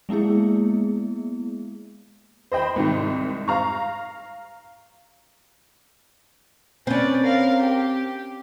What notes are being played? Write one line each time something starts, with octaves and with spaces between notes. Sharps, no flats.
G#3 A#3 B3 E4 G#4
C5 D#5 G5 B5
C2 G#2 D#3
F5 A#5 C#6
C4 C#4 B4 D5
A#4 F5
G4